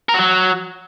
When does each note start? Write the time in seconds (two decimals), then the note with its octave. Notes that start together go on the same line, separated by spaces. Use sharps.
0.09 A#4
0.14 F#4
0.19 F#3